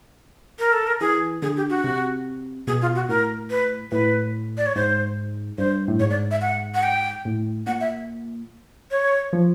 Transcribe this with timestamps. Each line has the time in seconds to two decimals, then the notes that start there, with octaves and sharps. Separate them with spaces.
0.59 A#4
0.72 A4
0.87 A#4
1.00 E3 G#4
1.42 D3 G#4
1.57 G4
1.70 F#4
1.84 C3
2.67 B2 G#4
2.82 F4
2.95 F#4
3.09 A2 A#4
3.50 B4
3.92 A2 B4
4.58 D5
4.66 C#5
4.76 G#2 C5
5.58 G2 C5
5.88 A2
6.00 G#2 C#5
6.10 D5
6.31 E5
6.41 F#5
6.74 F#5
6.83 G5
7.25 A2
7.67 A#2 F#5
7.81 E5
8.91 C#5
9.33 F3